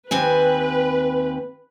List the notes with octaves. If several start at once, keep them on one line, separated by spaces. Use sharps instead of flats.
D#2 C4 B4 G#5